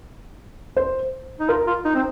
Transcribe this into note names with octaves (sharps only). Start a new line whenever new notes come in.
C5
D#4
F4 A#4
F4
D#4
C4